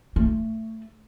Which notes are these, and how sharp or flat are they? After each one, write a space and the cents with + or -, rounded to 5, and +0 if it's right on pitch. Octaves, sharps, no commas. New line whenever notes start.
A3 +15